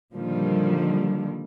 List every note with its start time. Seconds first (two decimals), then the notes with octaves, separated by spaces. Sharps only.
0.13 A#2 D3 D#3 F3 G3